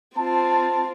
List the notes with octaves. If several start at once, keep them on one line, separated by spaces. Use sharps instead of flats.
C4 F4 A5